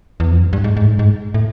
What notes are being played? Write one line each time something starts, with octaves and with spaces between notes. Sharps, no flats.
E2
F2
F#2
G2
G#2
G#2
A2
G#2
G#2
A2